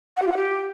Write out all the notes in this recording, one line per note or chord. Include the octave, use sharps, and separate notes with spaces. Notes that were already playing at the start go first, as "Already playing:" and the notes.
F#5
G4
F4
F#5
G4